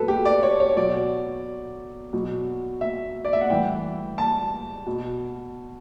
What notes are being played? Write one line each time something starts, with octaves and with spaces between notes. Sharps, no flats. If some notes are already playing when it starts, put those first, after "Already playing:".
Already playing: B2 F#3 A4 B4
G4
D5
C#5
C#5
B2 F#3 D5
B2 F#3
E5
D5
E5
F#5
A2 E3 G3 G5
A5
B2